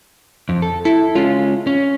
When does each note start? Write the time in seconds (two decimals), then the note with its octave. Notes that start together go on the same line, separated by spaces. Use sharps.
0.49 F2
0.62 A4
0.85 E4 A4
1.15 G#3 C#4 F4
1.67 C#4